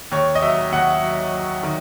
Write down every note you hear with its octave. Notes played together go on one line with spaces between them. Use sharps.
D#2 C#5
D#5
F#3 E5
D#2 F#5
F#3
F#3
D#3